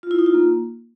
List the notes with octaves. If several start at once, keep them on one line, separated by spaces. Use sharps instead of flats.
F4
E4
D#4
F4
A#3